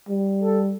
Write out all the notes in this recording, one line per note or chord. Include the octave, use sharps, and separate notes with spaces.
G3
A4